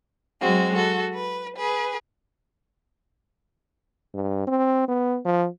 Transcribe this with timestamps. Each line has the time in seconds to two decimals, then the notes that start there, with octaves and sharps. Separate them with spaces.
0.41 F#3 G#3 C4 F#4
0.75 F#4 A4
1.13 B4
1.56 G#4 B4
4.14 G2
4.47 C4
4.88 B3
5.25 F3